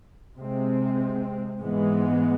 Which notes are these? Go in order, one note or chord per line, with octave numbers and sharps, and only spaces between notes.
C3 G#3 C4
G#2 E3 G#3 B3